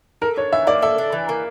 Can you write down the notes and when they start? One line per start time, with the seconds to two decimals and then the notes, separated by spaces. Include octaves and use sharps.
0.22 A4 A#4
0.36 D4 C#5
0.53 E3 E5
0.67 A#3 D5
0.82 A4 E5
0.98 D4
1.12 E3
1.29 A#3